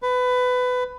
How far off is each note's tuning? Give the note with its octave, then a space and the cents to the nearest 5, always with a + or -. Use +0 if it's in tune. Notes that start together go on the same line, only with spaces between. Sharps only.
B4 +20